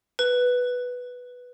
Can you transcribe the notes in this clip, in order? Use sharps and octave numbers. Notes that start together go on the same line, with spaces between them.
B4